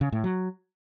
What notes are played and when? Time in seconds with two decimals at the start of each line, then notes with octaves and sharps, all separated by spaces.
0.01 C#3
0.12 A2
0.24 F#3